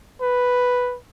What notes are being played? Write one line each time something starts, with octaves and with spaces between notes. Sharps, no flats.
B4